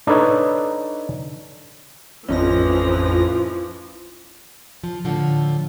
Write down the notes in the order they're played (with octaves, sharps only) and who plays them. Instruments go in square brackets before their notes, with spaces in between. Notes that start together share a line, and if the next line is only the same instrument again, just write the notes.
[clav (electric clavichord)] D4 D#4 A4 B4 C#5
[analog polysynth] A1 F2 A#6 [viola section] E3 F3 [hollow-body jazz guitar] C#4 D#4
[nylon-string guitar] F3
A2 D3 F3